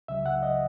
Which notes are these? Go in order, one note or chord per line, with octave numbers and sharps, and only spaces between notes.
C#2 C#3 F#3 E5
F#5
D#5